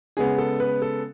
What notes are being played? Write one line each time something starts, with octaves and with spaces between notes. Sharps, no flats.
C#3 G#3 B3 G#4
A4
B4
A4